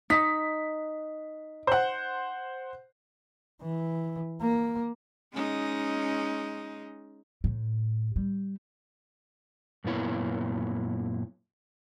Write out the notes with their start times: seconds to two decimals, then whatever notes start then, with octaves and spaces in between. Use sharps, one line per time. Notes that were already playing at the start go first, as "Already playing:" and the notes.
0.10 D#4 B6
1.67 C5 F#5
3.62 E3
4.41 A#3
5.34 G#3 C#4 D#4
7.44 A2
8.16 G3
9.84 F#2 A#2 B3 E4 C#5